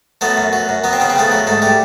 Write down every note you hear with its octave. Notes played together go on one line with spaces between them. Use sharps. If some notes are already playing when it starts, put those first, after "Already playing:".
F#3 A3 B3
F#2
F#3
F#2
F#3 B3
C4
C#3 B3
C4
C#3 A3 B3
F#3
G#2 A3
G3 A3